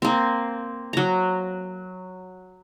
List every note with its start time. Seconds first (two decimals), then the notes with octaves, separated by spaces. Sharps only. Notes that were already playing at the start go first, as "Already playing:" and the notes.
0.02 A#3 C4
0.93 F#3 A#5